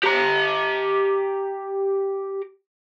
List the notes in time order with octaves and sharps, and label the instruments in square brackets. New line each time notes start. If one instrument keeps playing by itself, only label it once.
[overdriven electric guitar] G4 A#5